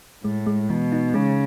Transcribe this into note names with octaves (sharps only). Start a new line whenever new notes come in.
A2 G#3
G#3
B2 E3
D#4
C#3 G#3